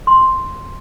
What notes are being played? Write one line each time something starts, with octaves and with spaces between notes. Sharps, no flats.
C6